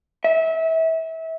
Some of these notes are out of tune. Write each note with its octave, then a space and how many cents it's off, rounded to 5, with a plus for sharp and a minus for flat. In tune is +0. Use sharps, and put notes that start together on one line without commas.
E5 -25